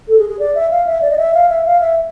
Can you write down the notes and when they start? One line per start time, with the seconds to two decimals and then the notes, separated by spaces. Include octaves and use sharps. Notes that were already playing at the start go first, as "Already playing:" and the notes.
0.08 A4
0.19 G#4
0.29 G#4
0.39 D5
0.55 E5
0.71 F5
0.87 E5
1.02 D5
1.11 D#5
1.18 E5
1.34 F5
1.49 E5
1.65 F5
1.81 E5